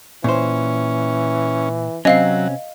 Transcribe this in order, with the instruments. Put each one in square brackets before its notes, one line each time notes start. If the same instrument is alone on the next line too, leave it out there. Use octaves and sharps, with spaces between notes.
[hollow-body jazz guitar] A#2 C5 [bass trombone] E3 [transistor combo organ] C#4
[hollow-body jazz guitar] C3 C4 C#4 [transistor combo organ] F#3 [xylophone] D#5 F5 C7